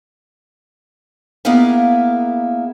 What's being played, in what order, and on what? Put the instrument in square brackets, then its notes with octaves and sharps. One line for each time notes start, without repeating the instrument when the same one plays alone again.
[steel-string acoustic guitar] A#3 B3 E4 G#4 A#4 F5